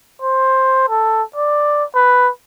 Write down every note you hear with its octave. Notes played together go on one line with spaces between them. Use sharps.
C5
A4
D5
B4